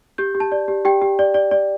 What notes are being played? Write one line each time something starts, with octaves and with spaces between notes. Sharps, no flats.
G4 G6
G4
A5
D5
G4
G4 G5
G4
D5
D5
D5